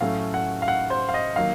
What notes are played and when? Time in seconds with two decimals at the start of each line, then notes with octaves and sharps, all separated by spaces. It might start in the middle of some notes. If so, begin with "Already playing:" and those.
0.01 A2 F#3 A3 C#4 F5
0.34 F#5
0.62 F5
0.68 F#5
0.90 C5
1.09 F5
1.14 D#5
1.36 D#3 F#3 A#3 D#4 F5